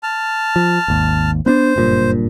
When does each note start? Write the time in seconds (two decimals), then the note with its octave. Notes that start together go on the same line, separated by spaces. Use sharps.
0.03 A5 F6
0.56 F3
0.88 G#1 D#2
1.46 B3 C#4 D4 C5
1.76 F#1 G2 A#2